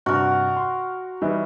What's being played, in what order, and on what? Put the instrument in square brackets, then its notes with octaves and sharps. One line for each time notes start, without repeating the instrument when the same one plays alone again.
[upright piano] G2 C3 [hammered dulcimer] F#4 A#4
[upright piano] C6
E3 G3 D#4